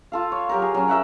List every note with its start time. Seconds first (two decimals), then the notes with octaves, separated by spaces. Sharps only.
0.12 F4 A4 F5
0.32 C#5
0.49 F#3 G4 A#4
0.62 G#4
0.74 F#3 C#4
0.88 A#4 E5 F#5 G5